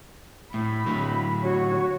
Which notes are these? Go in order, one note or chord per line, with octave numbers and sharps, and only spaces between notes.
A2 B5
A2 D3 F#3
F#4 C#5